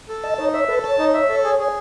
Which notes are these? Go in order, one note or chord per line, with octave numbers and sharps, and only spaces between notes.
A4
D#5 A5
D#4 C#5
C#5 E5
A4 B4
C#5 A5
D#4
E5
A4
G#4
G#4